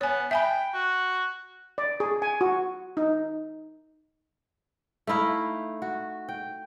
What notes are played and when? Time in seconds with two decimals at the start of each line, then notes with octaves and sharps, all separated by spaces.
0.01 B3 C#5 G#5
0.31 E5 G5 G#5 B5
0.74 F#4
1.78 D5
2.00 G#4
2.22 G#5
2.41 F#4
2.97 D#4
5.07 A3 D#4 E4 F5
5.82 F#4
6.29 G5